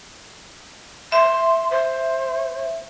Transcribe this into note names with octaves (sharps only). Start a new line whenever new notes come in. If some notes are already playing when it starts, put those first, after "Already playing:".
E5 C6
C5